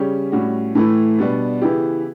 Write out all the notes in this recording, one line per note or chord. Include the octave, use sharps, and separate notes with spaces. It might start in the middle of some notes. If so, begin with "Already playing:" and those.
Already playing: C#3 G3 C#4 G4
A2 G3 C#4 F#4
A2 E3 A3 E4
B2 G3 B3 D4
C#3 E3 B3 E4 G4